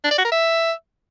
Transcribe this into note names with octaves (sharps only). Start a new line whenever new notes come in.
D4
D5
F#4
A#4
E5